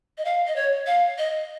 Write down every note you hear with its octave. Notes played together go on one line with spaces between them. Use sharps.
D#5
F5
D#5
C#5
F5
D#5